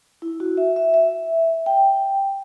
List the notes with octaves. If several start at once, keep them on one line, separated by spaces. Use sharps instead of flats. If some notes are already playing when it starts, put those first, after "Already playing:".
E4
F#4
E5
E5
E5
G5